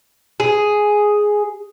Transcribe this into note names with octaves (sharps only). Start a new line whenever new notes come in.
G#4